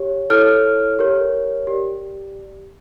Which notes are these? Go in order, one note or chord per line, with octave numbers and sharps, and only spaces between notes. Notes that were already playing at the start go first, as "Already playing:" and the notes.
Already playing: G4 C#5
E4 A4 C#5 F6
G4 A#4 C#5
G4 D5